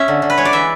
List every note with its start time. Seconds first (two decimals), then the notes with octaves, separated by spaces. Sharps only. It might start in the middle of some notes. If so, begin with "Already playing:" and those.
Already playing: C#4 E5
0.08 D3
0.22 D3
0.30 B4
0.38 G#3 C#5
0.45 D5
0.53 E3 E5